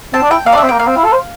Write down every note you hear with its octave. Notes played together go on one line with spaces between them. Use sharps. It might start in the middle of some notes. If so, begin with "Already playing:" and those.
C4 A5
D4
E4 G5
A#3 F5
D5
D4 E5
C4
A#3 G5
A#3 F5
C4
E4
A4
C5